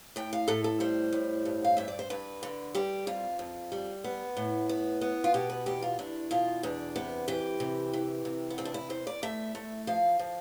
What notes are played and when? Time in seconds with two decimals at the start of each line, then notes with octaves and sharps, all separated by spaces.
0.16 A2 G5
0.33 F5
0.48 A2 A4
0.64 A4
0.80 G3 C5
1.13 A2
1.45 G2
1.64 F5
1.77 G2 E5
1.88 D5
1.99 C5
2.10 G2 B4
2.43 D3
2.75 G3 G4
3.07 F2 F4
3.39 F2
3.72 G3
4.04 B3
4.37 A2
4.69 B3
5.01 B3
5.24 F4
5.34 B2 G4
5.50 B4
5.66 E2 G4
5.82 F4
5.99 E2 D4
6.31 B2 F4
6.63 E2 D4
6.96 C3 B3
7.28 E3 G4
7.60 C3
7.93 E3
8.25 C3
8.50 B3
8.58 E2 C4
8.65 D4
8.74 E4
8.90 E2 C5
9.07 D5
9.23 A3 E5
9.55 A3
9.87 F3 F5
10.19 F3